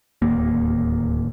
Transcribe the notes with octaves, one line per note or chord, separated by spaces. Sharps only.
D1 D#2 A#3